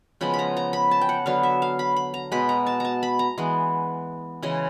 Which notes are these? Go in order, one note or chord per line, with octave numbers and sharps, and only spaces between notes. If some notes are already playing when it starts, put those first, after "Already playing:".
C#3 F3 G#3 B3 B5
B5
A#5
A#5
B5
A5
G5
F#5
D3 F#3 B3 F5
E5
F5
B5
B5
A#5
B2 G#3 B3 B5
A#5
A5
A5 A#5
B5
A#5
E3 G#3 B3
C#3 E3 G#3 D#5